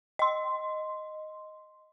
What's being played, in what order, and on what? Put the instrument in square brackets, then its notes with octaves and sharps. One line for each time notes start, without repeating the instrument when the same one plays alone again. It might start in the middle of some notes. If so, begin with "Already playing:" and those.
[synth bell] D#5 C6